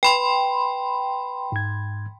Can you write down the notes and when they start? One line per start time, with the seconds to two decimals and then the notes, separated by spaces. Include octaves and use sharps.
0.03 B4 G5 B5 C6
1.52 G#2 G#6